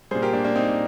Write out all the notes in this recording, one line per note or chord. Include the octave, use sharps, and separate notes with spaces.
A#2 G3 G#4 C5
G4 A#4
A#3 D4
A#3 D4
C4 D#4